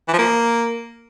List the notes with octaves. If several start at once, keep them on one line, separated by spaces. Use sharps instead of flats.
E3
F3
A#3